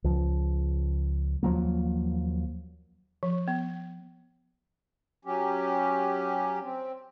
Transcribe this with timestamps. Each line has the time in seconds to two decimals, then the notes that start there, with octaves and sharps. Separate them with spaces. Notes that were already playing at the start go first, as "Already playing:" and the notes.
0.04 C#2 F3
1.43 D#2 F3 F#3 A#3
3.23 F3
3.48 B3
5.25 F#3 C#4 G4
6.62 C4